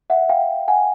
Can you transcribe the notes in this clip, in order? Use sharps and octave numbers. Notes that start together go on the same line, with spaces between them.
E5 F#5
F5 G5
F#5 G#5